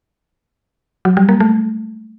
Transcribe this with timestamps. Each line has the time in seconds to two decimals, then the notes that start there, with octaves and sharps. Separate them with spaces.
1.05 F#3
1.17 G3
1.29 A#3
1.40 A3